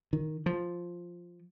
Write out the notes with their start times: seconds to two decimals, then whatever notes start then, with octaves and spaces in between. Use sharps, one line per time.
0.13 D#3
0.46 F3